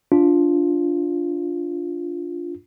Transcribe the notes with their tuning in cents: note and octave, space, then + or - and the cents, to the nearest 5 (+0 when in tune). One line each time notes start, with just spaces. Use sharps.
D4 -10 F4 +0